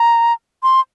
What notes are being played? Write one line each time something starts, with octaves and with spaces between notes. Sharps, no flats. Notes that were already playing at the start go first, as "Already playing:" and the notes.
Already playing: A#5
C6